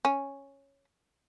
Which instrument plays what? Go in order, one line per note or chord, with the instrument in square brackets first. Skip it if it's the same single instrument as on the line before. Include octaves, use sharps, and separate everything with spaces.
[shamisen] C#4